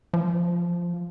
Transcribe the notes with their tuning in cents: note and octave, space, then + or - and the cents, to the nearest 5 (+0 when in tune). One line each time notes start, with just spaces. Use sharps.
F3 -5